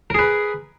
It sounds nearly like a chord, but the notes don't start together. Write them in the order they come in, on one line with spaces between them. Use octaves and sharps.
A#4 G#4 B4